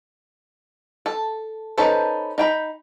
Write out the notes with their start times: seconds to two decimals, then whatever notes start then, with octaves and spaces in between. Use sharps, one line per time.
1.06 A4
1.78 C#4 D#4 A4 B4 C5
2.38 D#4 G5 B5